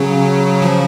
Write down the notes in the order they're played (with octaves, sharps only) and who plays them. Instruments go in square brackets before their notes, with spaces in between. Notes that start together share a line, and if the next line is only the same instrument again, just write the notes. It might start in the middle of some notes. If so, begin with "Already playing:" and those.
Already playing: [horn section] C#3 [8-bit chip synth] F#3
[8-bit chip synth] F3